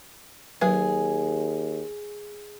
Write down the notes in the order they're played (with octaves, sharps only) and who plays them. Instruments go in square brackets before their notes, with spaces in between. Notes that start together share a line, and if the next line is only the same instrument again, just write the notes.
[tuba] D#2 [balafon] F#3 B4 [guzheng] G#4